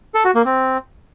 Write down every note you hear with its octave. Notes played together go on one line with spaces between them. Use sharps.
A4
F#4
A#3
C4